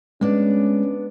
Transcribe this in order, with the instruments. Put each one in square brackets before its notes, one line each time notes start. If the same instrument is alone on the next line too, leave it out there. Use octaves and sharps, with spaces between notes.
[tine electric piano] G#3 [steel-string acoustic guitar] B3 D4 D5 [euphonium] C#4